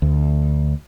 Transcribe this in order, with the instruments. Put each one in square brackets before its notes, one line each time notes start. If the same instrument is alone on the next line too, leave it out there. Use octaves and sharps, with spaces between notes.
[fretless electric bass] D2